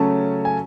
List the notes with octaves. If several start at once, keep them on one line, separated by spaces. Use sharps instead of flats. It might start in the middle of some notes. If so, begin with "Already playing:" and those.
Already playing: C#3 F#3 A3 C#4 A5
G#5